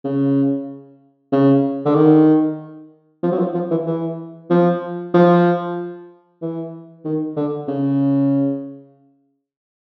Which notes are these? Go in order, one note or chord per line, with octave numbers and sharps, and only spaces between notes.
C#3
C#3
D3
D#3
F3
F#3
F3
F3
E3
E3
F3
F3
E3
D#3
D3
C#3